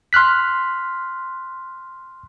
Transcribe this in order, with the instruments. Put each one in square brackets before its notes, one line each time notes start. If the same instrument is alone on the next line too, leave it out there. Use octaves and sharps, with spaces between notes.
[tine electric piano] C6 F6 F#6 B6